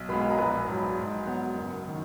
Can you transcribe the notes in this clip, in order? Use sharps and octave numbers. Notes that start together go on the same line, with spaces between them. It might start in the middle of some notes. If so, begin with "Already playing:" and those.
Already playing: B1
B2 G#3 B3 B4 B5
A#5
A#1 B4 B5
G#2 F#3
G#2
F#3 B3
F#1
D#3